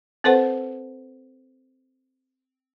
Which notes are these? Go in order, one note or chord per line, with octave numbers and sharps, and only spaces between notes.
C4 A4 B4 C5 F#5